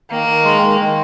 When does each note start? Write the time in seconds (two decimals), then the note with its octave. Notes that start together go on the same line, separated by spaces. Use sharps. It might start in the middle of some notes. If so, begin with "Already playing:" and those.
0.11 D#3 A#3
0.28 D#3
0.44 G#3
0.63 D#3
0.80 D#3